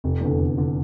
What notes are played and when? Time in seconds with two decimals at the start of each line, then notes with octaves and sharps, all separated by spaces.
0.04 F1
0.21 E2 D3
0.40 F1
0.58 D3